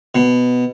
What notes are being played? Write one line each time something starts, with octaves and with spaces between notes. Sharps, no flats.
B2